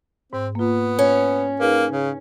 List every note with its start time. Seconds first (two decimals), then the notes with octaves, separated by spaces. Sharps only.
0.33 G#2 C4
0.55 A#3 B3 F4
0.99 C#4
1.60 A#3 D#4 G#4 B4
1.91 C#3